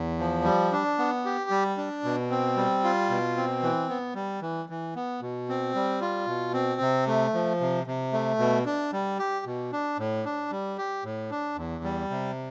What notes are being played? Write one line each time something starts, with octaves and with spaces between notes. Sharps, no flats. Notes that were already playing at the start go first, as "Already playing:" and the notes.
Already playing: E2
F3
G3
D4
B3
G4
G3
D4
B2
C4
G3
F4
B2
C4
E3
B3
G3
E3
E3
B3
B2
C4
G3
F4
B2
C4
C3
A3
F3
C3
C3
A3
B2
D4
G3
G4
B2
D4
A2
D4
G3
G4
A2
D4
E2
G3
C3